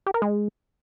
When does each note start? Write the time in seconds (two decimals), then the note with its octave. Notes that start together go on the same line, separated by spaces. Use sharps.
0.06 G4
0.14 A#4
0.22 G#3